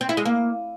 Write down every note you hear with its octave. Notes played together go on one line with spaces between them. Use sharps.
C4
E4
G#3
A#3